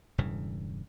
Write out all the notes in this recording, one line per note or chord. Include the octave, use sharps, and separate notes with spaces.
E1 G2 C#3 E3